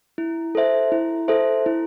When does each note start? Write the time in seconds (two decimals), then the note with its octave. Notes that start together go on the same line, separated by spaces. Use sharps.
0.18 E4
0.55 A4 C5 E5
0.92 E4
1.28 A4 C5 E5
1.66 E4